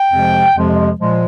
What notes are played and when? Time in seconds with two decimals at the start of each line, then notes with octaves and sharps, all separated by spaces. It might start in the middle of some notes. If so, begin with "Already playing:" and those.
Already playing: G5
0.11 F2 C3 F3 G#3
0.55 F2 C3 F3 G#3
0.99 A#2 F3 G#3